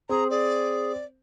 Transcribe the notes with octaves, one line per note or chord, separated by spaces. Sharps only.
C4 G#4 A#5
G#4 D5